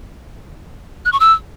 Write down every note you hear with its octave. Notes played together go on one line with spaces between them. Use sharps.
F#6
C#6
E6